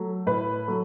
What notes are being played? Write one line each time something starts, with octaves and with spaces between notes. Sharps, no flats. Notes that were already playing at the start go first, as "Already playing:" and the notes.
Already playing: F#3 A3
A2 B4
F#3 A3